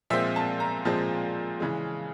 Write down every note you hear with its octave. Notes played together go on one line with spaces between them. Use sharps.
A#2 F3 G#3 C4 E5
A5
A#5
A#2 F3 G#3 C4 A5
C#3 E3 G#3